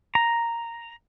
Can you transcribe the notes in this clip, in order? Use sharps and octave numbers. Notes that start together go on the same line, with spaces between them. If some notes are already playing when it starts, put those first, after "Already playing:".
A#5